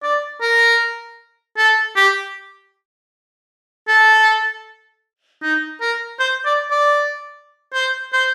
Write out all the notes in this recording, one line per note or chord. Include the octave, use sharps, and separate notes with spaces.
D5
A#4
A4
G4
A4
D#4
A#4
C5
D5
D5
C5
C5